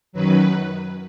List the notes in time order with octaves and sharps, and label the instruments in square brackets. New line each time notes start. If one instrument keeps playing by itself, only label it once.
[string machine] F#2 D#3 F#3 B4